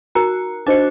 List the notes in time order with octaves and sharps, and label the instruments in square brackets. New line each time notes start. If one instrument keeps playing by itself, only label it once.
[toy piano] D#4 A#4 A#5 [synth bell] F#4
[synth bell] D4 F#4 [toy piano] D#4 C5 D#5